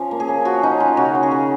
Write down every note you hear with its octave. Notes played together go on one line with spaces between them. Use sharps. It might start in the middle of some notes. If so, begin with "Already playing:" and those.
Already playing: F3 C#4
A#3
G#4
C#4
F3 F#4
C#4 D#4
C#4 F4
C#3 F#4
C#4
G#4
C#3